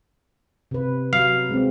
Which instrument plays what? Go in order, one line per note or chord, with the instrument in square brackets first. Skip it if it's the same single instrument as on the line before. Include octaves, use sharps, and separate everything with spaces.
[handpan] C3 B4
[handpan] F#3 [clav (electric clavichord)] F5
[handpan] G#3 C4